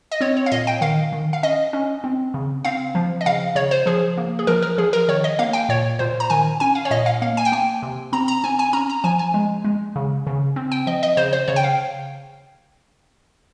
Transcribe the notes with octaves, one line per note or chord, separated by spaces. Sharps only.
D#5
C4 C#5
C#5
F5
A#2 D#5
G5
D#3 F5
D#3
F5
C#4 D#5
C#4
C4
C#3
C4 F5
F3
D#5
C#3 F5
C#3 C#5
C5
F3 G#4
A#3
G#4
F3 A#4
A#4
F3 G#4
A#4
D#3 C#5
D#5
A#3 F5
G5
A#2 C#5
A#2 C5
A#5
D#3 G#5
C#4 G#5
F5
C#5
A#2 D#5
F5
A#3 F5
G#5
G5
A#3 G#5
C3
C4 A#5
A#5
C4 G#5
G#5
C#4 A#5
A#5
F3 G#5
G#5
G#3
G#3
C#3
C#3
C4
G5
F3 D#5
D#5
C#3 C5
C5
C#3 C#5
G5
F5